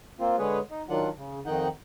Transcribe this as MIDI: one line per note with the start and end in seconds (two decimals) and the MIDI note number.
0.20 0.36 58
0.20 0.36 60
0.20 0.36 65
0.39 0.59 50
0.39 0.59 56
0.39 0.59 68
0.39 0.59 71
0.39 0.59 73
0.70 0.82 63
0.89 1.09 51
0.89 1.09 54
0.89 1.09 62
0.89 1.09 65
0.89 1.09 78
1.17 1.40 49
1.46 1.68 41
1.46 1.68 51
1.46 1.68 63
1.46 1.68 78
1.46 1.68 79